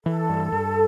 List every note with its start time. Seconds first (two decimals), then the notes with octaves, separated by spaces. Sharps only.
0.06 E3 A4
0.29 G2
0.52 G2